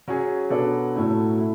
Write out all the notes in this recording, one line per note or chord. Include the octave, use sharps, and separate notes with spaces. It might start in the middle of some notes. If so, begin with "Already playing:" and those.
F#3 C#4 G#4
B2 F#3 B3 D4 A4
A2 F#3 A3 E4
A3 E4